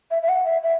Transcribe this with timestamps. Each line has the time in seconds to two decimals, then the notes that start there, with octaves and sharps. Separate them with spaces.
0.11 E5
0.22 E5
0.29 F#5
0.46 E5
0.63 E5